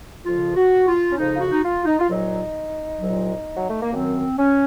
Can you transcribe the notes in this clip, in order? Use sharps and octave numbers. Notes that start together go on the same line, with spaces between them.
F2 C#3 F3 F4
F#4
F4
C#4
F2 C#3 F3 D#4
F4
F#4
D#4
F4
D#4
F4
C2 A#2 F#3 D#4
C2 A#2 F#3
F#3
A3
A#3
F#2 D#3 F#3 C4
C#4